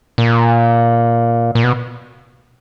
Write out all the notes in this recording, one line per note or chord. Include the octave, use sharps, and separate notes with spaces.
A#2
A#2
B2